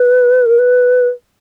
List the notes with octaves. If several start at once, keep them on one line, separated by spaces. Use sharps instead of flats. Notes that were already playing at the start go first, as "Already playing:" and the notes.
Already playing: B4
A#4
B4